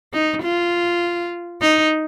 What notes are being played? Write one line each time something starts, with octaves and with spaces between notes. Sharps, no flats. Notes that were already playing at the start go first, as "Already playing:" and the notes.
D#4
F4
D#4